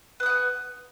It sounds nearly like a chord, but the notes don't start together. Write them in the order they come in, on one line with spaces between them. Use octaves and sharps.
B4 D#6 F#5 G#5